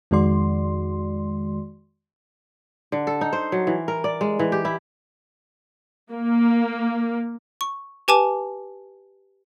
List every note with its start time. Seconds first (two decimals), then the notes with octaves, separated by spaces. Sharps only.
0.11 F2 D#3 G#3 F#4 D5 C6
2.92 D3
3.07 A4
3.21 D#4
3.33 C5
3.52 F#3
3.67 E3
3.88 A#4
4.04 D5
4.21 G#3
4.39 E3
4.52 G4
4.65 E4
6.11 A#3
7.61 C#6
8.08 G4 B4 G#5 A5 D6 E7